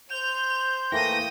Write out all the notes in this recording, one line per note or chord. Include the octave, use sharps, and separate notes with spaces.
C5 G6 F7
E3 A3 A#3 G5 D#6 A#6